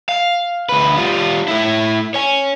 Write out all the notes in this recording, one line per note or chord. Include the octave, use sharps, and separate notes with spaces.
F5
D2 B4
G3 F4
A3 E4
C#5 G#5